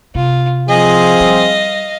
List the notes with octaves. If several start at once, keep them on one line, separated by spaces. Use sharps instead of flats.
C3 F4
F3 C4 G#4 D#5 F5
G3